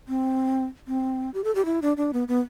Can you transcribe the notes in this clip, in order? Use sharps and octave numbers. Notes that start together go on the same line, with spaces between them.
C4
C4
G4
A4
G4
E4
D4
D4
B3
B3